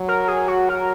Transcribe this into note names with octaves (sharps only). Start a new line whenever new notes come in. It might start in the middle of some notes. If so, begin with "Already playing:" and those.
Already playing: F#3
A#4
G#4
F#4
A#4